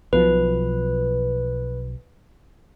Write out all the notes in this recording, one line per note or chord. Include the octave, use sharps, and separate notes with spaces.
B1 B2 F3 B4